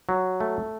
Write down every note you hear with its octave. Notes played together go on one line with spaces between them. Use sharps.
F#3
A3